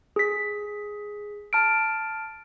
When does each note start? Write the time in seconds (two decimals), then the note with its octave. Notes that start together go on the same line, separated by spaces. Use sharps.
0.16 G#4 B6
1.53 A5 F6 D7